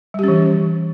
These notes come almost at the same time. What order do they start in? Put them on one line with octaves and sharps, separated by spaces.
G3 G4 C#4 E3